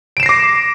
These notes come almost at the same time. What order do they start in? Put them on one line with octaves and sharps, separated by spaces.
D7 E7 C7 A#6 D6